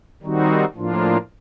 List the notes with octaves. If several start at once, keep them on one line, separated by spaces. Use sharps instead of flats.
D#3 G3 C4 D#4 F#4
A2 F3 A#3 D4 F4